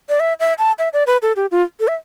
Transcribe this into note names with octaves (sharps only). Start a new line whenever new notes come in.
D5
E5
E5
A5
E5
D5
B4
A4
G4
F4
A4
E5